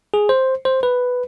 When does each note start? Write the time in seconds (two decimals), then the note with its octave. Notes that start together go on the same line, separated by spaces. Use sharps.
0.14 G#4
0.29 C5
0.65 C5
0.83 B4